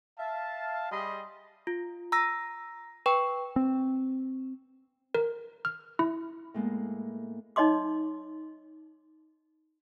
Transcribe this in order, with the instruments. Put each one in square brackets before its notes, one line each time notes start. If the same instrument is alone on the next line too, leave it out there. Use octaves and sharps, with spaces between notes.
[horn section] E5 F5 A5
G3 G4 G#4 D#5 B5 C6
[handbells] F4
A#5 E6 A#6
B4 G5 C#6
[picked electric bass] C4
[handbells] A#4
F6
E4
[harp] A2 G#3 A#3 B3
[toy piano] D#4 C#5 D#5 C6 D6